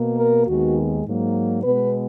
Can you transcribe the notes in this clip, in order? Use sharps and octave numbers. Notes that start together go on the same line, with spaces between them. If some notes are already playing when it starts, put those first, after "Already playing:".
Already playing: B2 A#3
A#4
D#2 D#3 G#3 B3 F#4
G#2 F#3 A#3
B2 G#3 B3 B4